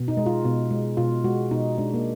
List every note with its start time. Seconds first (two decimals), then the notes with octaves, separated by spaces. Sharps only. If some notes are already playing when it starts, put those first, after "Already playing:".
Already playing: B2
0.08 D#4
0.17 G#3
0.26 F4
0.44 B2
0.71 G#3
0.97 B2 F4
1.24 G#3 F#4
1.51 B2 D#4
1.78 G#3 D4
1.94 A#3